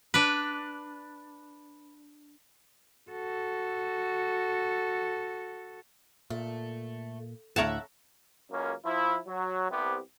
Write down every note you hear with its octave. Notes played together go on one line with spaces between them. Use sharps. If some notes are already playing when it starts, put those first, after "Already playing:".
D4 B4
F#4 A4
A#2 A3
D2 A2 A4 A#4 C#5 E5 F#5 A5
C#2 F#2 A#3 C#4
F3 E4
F#3
C2 C3 B3 G4